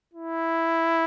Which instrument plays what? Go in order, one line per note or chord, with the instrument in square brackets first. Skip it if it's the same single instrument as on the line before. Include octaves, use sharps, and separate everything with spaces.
[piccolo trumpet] E4